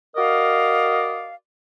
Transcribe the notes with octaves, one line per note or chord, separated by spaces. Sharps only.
F#4 A#4 D5 D#5 F5